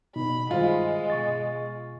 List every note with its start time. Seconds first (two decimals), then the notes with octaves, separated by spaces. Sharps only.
0.16 B2 D#4 B5
0.51 G2 D#3 G#3 F4 C5
1.10 B2 C#6 A6